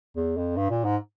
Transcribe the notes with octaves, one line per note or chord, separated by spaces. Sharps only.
E2
F2
G2
A#2
G#2